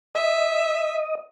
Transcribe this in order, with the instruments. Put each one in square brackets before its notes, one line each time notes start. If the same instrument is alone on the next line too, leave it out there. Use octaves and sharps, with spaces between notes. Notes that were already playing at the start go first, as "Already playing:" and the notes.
[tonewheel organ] D#5 [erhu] E5